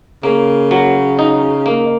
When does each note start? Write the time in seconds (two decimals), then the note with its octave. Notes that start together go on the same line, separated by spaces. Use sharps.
0.23 C#3 A#3
0.71 F#3
1.19 D#4
1.66 A#3